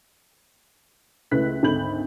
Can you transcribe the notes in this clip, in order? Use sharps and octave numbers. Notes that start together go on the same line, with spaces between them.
C#2 A3 E4 B4 F#6 B6
G#1 D2 A4 B5 G6 F#7